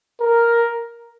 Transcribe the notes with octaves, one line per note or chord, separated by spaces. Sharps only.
A#4